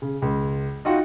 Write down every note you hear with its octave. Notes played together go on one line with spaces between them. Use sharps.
C#3
C#2
D#4 F4 F#4 F#5 G5